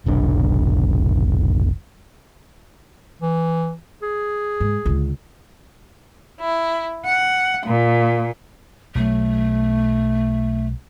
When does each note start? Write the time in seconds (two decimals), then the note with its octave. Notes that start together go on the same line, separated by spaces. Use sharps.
0.06 F1 B1 D4
3.22 E3
4.02 G#4
4.60 G#2
4.85 C#2 D3
6.40 E4
7.04 F#5
7.66 A#2
8.95 B1 F#3 A3